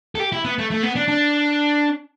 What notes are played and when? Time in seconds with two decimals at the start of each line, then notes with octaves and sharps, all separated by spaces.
0.15 A4
0.20 G4
0.32 E4
0.44 B3
0.58 A3
0.71 A3
0.83 B3
0.96 D4
1.08 D4